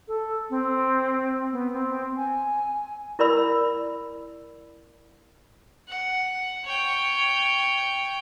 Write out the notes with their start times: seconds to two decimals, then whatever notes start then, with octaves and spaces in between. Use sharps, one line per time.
0.08 A4
0.50 C4
1.52 B3
1.73 C4
2.17 G#5
3.19 E4 A#4 D5 B5 E6
5.87 F#5
6.65 C#5 G5